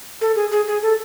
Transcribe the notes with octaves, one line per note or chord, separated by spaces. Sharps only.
A4
G#4
G#4
G#4
A4